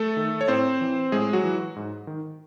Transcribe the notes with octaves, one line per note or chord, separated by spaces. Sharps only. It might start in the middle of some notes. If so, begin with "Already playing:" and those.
Already playing: A3 A4
D#3
C#5
A2 C4 C5
E3
A2 G#3 G#4
F#3 F#4
E3
G#2
D#3